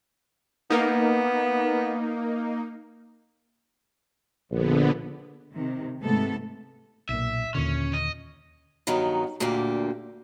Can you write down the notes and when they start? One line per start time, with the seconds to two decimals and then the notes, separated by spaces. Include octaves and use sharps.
0.70 A#3 B3 D#4
4.51 A#1 D3 B3
5.53 C3 D#3
6.01 G#2 C3 A3 B3 A4
7.09 B1 A#2 E5
7.55 D#2 A#2 D3 C#4
7.93 D#5
8.87 G2 D#3 F#3 B3 D#4
9.40 D2 A#2 D3 A#3 G4